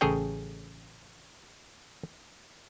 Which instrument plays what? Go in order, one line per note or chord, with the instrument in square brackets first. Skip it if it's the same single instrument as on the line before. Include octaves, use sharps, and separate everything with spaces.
[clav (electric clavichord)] A1 C#3 G#4 A4 C#5 G5